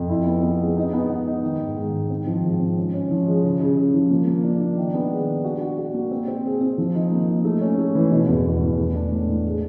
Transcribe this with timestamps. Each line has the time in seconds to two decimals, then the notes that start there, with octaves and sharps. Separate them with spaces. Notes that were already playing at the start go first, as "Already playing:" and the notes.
Already playing: F2
0.09 E4
0.27 B3
0.43 B3
0.60 G#3
0.77 D#4
0.93 B3
1.10 B3
1.27 D#4
1.43 D#3
1.60 G#2
1.76 G#2
1.93 D#3
2.10 C4
2.27 F3
2.43 G#2
2.60 C4
2.77 C#4
2.94 C#4
3.11 F3
3.27 G#3
3.44 C#3
3.60 C#3
3.77 C#3
3.94 F3
4.11 A#3
4.27 A#3
4.44 D4
4.60 D4
4.77 D#3
4.94 B3
5.11 G#3
5.28 D4
5.45 F#4
5.61 F#4
5.78 F#4
5.94 A#3
6.11 C4
6.28 C4
6.45 G#4
6.61 C4
6.78 F3
6.95 D#4
7.12 A#3
7.28 D#4
7.44 A3
7.61 C#4
7.78 A3
7.95 E3
8.11 B2
8.28 E2
8.45 E2
8.61 E2
8.78 A3
8.95 D4
9.12 A2
9.28 A2
9.45 G#3